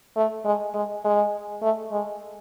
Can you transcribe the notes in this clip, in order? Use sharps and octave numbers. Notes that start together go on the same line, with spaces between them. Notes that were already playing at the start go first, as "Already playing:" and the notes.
A3
G#3
G#3
G#3
A3
G#3